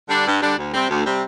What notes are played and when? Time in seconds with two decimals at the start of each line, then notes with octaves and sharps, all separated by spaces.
0.09 D3 G3 D4
0.26 G2
0.41 D3 G3 D4
0.57 D2
0.74 C3 G3 C4
0.89 D2
1.05 C3 G3 C4